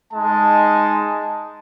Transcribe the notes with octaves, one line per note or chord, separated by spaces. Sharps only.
G#3 D#4 A5